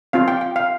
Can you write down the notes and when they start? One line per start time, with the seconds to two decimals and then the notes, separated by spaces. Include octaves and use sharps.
0.13 C4 F4 F5
0.28 G5
0.41 G5
0.56 F5